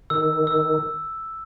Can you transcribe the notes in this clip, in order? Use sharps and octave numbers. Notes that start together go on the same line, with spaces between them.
D#3 E6
E6